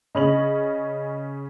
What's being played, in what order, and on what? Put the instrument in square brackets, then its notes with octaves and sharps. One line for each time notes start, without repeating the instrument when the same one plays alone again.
[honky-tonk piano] C#3 C#4 F#7 [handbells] D#5 B5